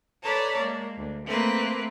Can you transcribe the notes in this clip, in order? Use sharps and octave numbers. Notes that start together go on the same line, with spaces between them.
A4 B4 C#5 D5 A5 A#5
G#3 A#3
D2
A3 A#3 C4 B4